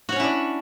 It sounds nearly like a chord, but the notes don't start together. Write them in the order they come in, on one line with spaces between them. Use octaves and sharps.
F#4 C#5 C#4 E4 D4